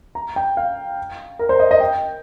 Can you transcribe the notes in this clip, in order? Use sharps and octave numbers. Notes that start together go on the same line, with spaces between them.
A#5
G5
F5
A#4
C5
D#5
D#5
G5